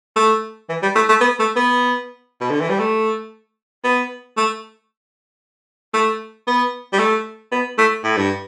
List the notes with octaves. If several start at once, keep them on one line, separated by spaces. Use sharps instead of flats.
A3
E3
G3
A3
A3
B3
A3
B3
B2
D3
E3
G3
A3
B3
A3
A3
B3
G3
A3
B3
A3
A2
G2